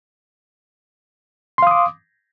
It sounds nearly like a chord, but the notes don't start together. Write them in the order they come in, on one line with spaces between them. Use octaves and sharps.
C6 F5 D#6 D6